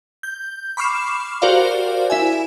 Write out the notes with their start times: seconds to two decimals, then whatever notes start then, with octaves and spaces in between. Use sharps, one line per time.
0.23 G6
0.77 B5 C#6 D6 F6 C7 E7
1.42 F#4 G4 A#4 C5 D5 F5
2.10 E4 E5 G#5